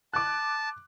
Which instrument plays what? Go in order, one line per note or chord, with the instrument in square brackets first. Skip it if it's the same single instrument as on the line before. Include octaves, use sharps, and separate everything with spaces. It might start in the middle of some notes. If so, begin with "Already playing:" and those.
[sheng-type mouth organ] A5 [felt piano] D6 F#6